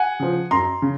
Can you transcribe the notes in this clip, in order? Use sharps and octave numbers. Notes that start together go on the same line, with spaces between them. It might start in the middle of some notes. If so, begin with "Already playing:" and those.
Already playing: F#5 G#5
C#3 F3
F#2 A#5 C6
C#3